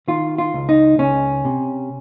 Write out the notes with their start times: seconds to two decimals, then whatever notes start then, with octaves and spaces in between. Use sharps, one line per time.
0.08 D#3 F4
0.38 F4
0.54 C#2
0.69 D#4
0.98 C#2 C#4
1.45 C3